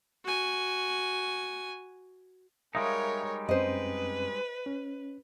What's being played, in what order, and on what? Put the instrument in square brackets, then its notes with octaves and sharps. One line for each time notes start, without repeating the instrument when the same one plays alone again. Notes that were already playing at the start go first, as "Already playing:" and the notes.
[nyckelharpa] F#4 G#5
[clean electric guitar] G3 G#3 D#4 [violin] A#4 C#5 [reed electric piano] E5 F5 D#6
[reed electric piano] F#2 C4 C#4 [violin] B4 [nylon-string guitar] C5 D#5
[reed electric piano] C#4